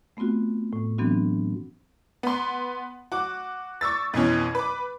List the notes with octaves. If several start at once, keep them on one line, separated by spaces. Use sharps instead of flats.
A3 B3 C4 F4 F#4
A2
E3 F#3 B3 C4 D4 F#4
B3 C6
F#4 D6
C#6 D6 E6 A6
F2 B2 E3 C#4
B4 D6